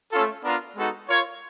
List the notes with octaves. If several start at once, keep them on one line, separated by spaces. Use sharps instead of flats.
A3 C#4 F4 A4
B3 D4 F4 A#4
G#3 B3 D#4 F#4 A4
F4 A#4 C#5